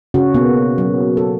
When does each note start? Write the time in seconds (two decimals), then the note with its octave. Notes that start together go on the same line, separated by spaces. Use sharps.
0.14 C#3 C#4 F#4
0.34 B2 A#3 B3
0.78 F#3
1.17 A4